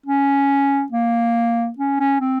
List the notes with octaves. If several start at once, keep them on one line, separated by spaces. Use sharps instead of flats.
C#4
A#3
C#4
C#4
C4